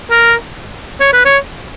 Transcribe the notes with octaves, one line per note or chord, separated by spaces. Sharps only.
A#4
C#5
B4
C#5